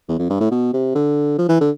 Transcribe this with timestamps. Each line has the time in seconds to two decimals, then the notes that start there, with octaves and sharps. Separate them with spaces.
0.08 E2
0.19 F2
0.30 G2
0.40 A2
0.51 B2
0.73 C3
0.95 D3
1.38 F3
1.49 E3
1.60 D3